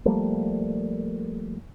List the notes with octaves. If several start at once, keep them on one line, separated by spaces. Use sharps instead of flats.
F3 G3 A3 A#3